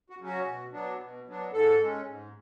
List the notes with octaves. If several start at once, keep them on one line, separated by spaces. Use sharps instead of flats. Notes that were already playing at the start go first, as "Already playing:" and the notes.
F#4
C#3 F#3 C#4
F#4
B2
F#3 B3 D4
B2
F#3 B3 D4
G#2 A4
G#3 C#4
G#2